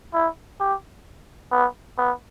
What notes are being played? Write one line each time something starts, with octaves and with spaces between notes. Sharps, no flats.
E4
G4
B3
B3